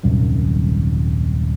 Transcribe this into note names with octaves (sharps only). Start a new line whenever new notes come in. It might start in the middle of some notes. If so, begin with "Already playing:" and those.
D#1 C2 F#2 D#3